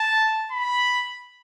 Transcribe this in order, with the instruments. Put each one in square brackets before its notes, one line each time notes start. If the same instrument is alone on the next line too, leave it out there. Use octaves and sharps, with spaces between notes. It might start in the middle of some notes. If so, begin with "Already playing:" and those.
Already playing: [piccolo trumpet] A5
B5